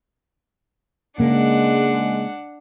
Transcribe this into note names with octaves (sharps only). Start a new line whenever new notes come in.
C#3 G#3 A#3 D4 F#5